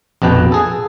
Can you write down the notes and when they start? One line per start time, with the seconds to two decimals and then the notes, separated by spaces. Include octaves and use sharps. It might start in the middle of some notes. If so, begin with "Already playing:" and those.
0.22 A#1 F2 B2 B4 G5
0.52 G#4 A4